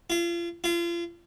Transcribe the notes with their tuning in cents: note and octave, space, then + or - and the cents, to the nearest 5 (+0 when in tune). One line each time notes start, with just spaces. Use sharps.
F4 -35
F4 -35